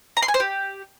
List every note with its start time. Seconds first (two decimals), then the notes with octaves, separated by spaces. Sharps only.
0.17 A#5
0.22 C6
0.28 G#5
0.34 C5
0.40 G4